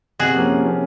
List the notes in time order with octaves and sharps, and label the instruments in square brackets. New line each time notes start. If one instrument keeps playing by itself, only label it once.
[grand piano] C3 [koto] F#4 G#4
[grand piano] F3 A#3 C#4
C3
F3 A#3 C#4